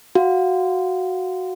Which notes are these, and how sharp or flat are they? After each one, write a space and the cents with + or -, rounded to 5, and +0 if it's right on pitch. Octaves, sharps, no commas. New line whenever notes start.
F#4 +0 F5 +0